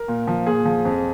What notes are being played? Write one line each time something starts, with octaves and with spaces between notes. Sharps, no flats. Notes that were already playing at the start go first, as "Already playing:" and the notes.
Already playing: A#4
A#2
F3
A#2 G#4
F3
F2